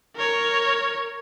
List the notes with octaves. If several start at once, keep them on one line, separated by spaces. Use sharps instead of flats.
A#4 C#5